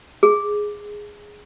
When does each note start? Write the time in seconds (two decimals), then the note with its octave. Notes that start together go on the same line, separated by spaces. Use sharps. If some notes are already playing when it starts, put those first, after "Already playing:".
0.23 G#4